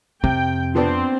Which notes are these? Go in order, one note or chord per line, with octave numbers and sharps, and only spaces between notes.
F2 C3 G5
F3 B3 C4 D4